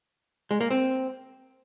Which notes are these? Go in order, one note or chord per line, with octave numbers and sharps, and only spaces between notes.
G#3
A#3
C4